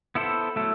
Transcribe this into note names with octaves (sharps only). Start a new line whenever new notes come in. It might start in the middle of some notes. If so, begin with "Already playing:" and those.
B3 E4 A4 C5
F#3 A3 E4 A4